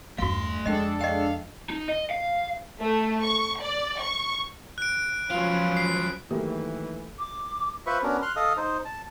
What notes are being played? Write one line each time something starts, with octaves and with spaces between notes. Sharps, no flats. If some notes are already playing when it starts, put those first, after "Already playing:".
E2 G2 A3 F#4 F5 C6
F2 G#3 D4 A4 D#5 G5
D#5 F5 G5
D#4
D#5
F5
A3
C#6
D5
C#6
F#6 D7
F3 F#3 C#4 F4 B4
C7
D#3 E3 F#3 A3 A#3 G4
D6
F4 B4 C5 E5 B5 C#6
B3 C#4 D4 F#4 A#4
C6 F6 F#6
A4 D#5 F5 D#6
D#4 C5
A5